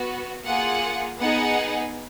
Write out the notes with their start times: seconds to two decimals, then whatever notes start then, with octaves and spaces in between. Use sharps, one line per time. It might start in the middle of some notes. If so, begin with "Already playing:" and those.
Already playing: B3 F#4
0.44 A#3 F4 G#4 F#5
1.19 B3 D#4 G#4 F#5